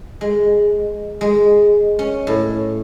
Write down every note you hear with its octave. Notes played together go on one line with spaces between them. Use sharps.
G#3
G#3
C#4
A2